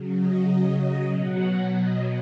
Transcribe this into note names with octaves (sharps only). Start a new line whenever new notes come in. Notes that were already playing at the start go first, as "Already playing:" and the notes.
Already playing: C#3 F#3
D#5
D#5
D#5
B2 F#3 F#5
D#5